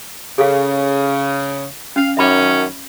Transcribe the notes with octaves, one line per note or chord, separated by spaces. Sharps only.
C#3 G#4 A4 F5
C#4 F5
F#2 D#3 C#4 E5 B5 D6